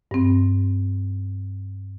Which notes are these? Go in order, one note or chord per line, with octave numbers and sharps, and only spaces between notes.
G2 C4